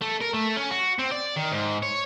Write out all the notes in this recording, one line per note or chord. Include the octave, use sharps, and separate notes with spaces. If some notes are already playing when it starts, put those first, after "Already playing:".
A3
A#4
A3
C#4
F#4
C4
D5
D#3
G#2
C#5